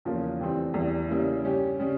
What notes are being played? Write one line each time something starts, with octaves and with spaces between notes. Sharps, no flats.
E2 C#3 F3 A#3
F2 E3 G3 C4
E2 E3 G3
C#3 G3 A#3 E4
G2 G3 C#4 G4
C#3 G3